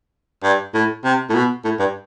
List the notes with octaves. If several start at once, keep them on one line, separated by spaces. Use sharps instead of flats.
G2
A2
C3
A2
B2
A2
G2